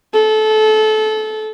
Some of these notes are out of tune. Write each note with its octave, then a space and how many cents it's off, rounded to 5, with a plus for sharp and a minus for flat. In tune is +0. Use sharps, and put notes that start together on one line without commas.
A4 -25